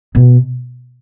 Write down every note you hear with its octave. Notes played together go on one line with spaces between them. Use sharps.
B2